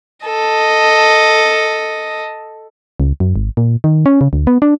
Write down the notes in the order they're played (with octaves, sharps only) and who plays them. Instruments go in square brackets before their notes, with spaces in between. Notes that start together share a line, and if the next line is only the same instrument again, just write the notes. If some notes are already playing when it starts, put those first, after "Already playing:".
[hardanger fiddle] A4 D#5
[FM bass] C#2
F#2
G#1
A#2
D#3
C#4
C#3
D2
B3
D4